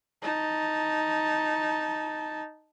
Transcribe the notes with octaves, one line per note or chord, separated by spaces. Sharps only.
D#4 A5